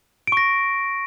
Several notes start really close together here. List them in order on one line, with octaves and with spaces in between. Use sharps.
D7 C#6 A#6